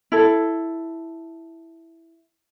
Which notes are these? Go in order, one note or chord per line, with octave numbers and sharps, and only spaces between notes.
E4 A4